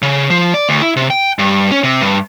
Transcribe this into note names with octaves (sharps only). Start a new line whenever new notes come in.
C#3
F3
D5
D2
E4
C3
G5
G2
C#4
C3
G2